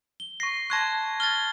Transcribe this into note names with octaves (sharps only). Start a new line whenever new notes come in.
G7
C#6 A#6 C7
A5 C6 C#6 F#6 G#6 A#6
F6 G#6 A6 G7